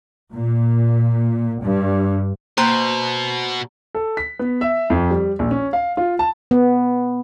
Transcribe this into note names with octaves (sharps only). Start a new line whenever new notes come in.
A#2
G2
B2 A#3 C5 A#5
A4
B6
B3
E5
F2
G3
A#1
C#4
F5
F4
A5
B3